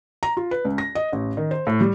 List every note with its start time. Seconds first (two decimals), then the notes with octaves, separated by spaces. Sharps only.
0.23 A#5
0.37 F4
0.51 B4
0.65 C#2
0.78 A#6
0.95 D#5
1.12 A1
1.37 D#3
1.51 C5
1.67 A2
1.81 G3